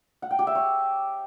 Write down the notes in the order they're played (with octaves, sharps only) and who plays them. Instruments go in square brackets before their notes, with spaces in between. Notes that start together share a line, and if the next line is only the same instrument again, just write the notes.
[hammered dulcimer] F#5
G5
G4
E5
C#5